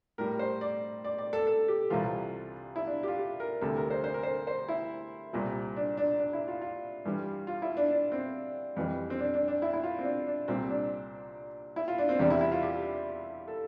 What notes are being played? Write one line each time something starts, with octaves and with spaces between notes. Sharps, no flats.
A2 G3 A#4
C5
D5
D5
D5
A4
A4
G4
C2 C3 E3 G3 F4
E4
D4
G4
F4
G4
A#4
D2 C3 G3 A4
A#4
C5
C5
A#4
C5
C5
E4
C2 A#2 G3
D4
D4
D4
E4
F4
F4
G2 E3 G3
F4
E4
D4
D4
C4
F2 E3 G3
C4
D4
D4
D4
E4
E4
F4
C4
D4
D4
C2 A#2 G3 C4
D4
E4
F4
D4
C4
E2 C3 G3 D4
E4
E4
F4
G4
A4